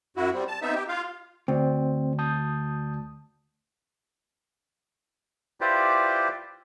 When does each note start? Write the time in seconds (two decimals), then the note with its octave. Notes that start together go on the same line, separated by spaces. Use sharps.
0.17 F#2 E4 F#4
0.34 G3 C4
0.48 A5
0.62 B3 C4 D#4 E5
0.75 G4
0.88 F4 F5
1.48 D2 C4
2.19 A5 D#6 G6
5.61 E4 F4 G4 B4 C5 D5